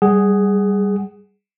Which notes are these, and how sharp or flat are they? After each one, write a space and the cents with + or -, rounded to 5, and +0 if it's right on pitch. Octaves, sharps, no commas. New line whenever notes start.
G3 +0 G#4 +0 F#5 +20